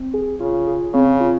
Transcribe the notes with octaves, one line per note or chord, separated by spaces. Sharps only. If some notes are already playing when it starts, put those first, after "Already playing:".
Already playing: C4
G#4
C#3 F4
G#4
C#3 C4
F4